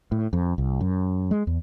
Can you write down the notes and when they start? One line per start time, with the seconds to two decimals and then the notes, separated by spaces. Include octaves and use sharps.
0.12 A2
0.33 F2
0.58 C2
0.81 F#2
1.31 G#3
1.47 E2